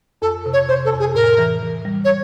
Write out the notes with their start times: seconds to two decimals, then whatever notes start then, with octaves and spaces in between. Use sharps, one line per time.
0.22 F2 A4
0.46 C3
0.53 C#5
0.68 C3 C5
0.85 A4
0.93 F2
0.99 G#4
1.15 A2 A#4
1.38 E3
1.62 E3
1.85 G3
2.05 C#5